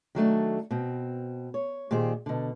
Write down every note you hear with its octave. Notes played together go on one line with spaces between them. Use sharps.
D#3 F#3 A3 D4
B2 C4
C#5
A#2 D#3 G4 G#4 C5
B2 D3